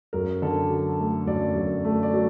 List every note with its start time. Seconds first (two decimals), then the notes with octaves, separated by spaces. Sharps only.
0.13 F#2 A#4
0.42 D3 A4
0.70 F#3
0.99 A3
1.27 F#2 D5
1.55 F#2
1.85 A3
2.03 D5
2.13 F#3